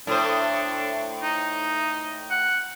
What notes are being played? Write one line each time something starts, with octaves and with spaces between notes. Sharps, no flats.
A2 D4 C5
D#4
F#5